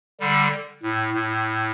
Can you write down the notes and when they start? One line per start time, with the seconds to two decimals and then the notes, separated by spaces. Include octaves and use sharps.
0.20 D3 G3
0.83 A2
1.14 A2